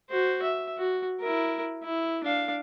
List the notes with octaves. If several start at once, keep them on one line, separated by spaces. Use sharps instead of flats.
F#4 C5
E5
F#4
E4 A#4
E4
D4 F5